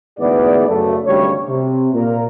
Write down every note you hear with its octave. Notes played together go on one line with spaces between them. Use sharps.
D2 G#2 E3 B3 G#4 D5
F#2 C#3 A3
G#1 D2 C#3 G3 C#5
C3
A#2 A#4